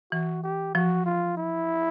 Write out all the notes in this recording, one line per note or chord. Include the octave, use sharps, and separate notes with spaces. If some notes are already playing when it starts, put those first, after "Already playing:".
E3 F#4
G4
F3 F#4
F4
E4